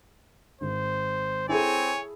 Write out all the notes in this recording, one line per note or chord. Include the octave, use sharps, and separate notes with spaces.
G#1 C5
C4 E4 G#4 A4 C#5 G#5